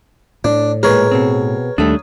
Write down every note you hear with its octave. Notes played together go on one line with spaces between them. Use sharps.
A2 D4
A#2 G#3 G#4 A#4 B4 C#5
B2 C4
D#2 G3 A3 D4 D#6